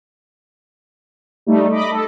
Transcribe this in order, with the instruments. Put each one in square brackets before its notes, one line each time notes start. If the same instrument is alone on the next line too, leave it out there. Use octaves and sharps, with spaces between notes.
[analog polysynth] G3 A3 D#4
D#5 B5 D6
A4